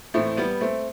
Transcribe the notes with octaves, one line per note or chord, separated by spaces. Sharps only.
A2 E3 A3 C4
G3 B3
A3 C4